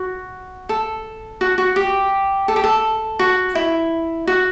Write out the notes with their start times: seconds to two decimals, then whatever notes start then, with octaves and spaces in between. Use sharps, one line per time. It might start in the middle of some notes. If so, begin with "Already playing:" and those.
Already playing: F#4
0.69 A4
1.41 F#4
1.58 F#4
1.76 G4
2.48 A4
2.56 G4
2.64 A4
3.19 F#4
3.55 E4
4.27 F#4